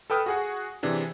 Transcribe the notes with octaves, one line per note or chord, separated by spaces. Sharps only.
A4 B4 G5 D#6 F6
F#4 G#4 F#5
C3 E3 D4 G#4